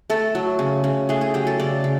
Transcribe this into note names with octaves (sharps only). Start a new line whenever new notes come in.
A3 A4
F#3
C#3
C#3
A3 G#4
G#4
F#3 G4
A4
C#3 D5
C#3